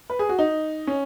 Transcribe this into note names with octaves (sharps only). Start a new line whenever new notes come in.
B4
G#4
F#4
D#4
C#4